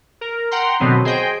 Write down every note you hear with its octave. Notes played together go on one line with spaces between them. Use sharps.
A#4
F#5 G5 A#5 C6
B2 D3 D#3 F#3 B3 C4
G#4 C5 D#5 G5